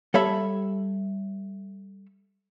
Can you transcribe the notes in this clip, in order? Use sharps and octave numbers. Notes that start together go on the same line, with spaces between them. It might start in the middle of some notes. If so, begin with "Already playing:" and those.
G3 A4 C#5 E5 B5